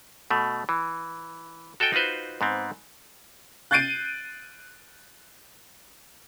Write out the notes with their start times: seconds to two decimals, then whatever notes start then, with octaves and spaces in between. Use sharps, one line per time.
0.30 B2 A3
0.69 E3
1.80 F#4 A4 D#5 G5 G#5
1.93 D#4 F4 F#4 B4 C5
2.41 G#2 B3 C4
3.71 F#6 G6 A6 C7 D7 D#7